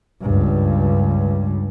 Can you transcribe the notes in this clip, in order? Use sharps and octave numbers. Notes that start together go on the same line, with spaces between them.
C#2 G2